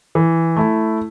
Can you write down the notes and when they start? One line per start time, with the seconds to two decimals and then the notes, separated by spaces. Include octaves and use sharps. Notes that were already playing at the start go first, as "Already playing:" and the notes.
0.15 E3
0.56 A3 E4